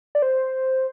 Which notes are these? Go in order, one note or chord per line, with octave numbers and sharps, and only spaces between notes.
D5
C5